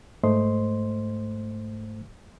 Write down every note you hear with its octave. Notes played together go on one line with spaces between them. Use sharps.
G#2 A3 C5 D#5 C6